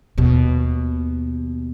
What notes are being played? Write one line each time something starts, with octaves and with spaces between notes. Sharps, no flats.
D#2 B2